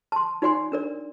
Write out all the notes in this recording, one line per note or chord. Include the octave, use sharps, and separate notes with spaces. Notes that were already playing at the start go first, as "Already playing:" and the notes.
A5 C6
D#4 F#4 D5 F#5 G#5 C6
D4 A#4 D5